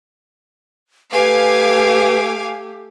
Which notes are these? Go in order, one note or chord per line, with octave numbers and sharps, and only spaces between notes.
A3 G4 B4 F5 G#5 D6